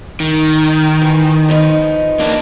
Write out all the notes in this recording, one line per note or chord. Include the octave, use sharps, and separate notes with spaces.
D#3
E3
F3 D#4 B4
A#3 D4